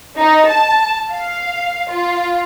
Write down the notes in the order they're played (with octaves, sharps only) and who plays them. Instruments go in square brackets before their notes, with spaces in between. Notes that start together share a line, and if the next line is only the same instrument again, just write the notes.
[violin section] D#4
A5
F5
F4